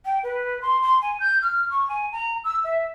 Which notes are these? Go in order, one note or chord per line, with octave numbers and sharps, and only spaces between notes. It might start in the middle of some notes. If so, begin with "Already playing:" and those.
G5
B4
C6
C6
G#5
G6
F6
C#6
G#5
A#5
E6
E5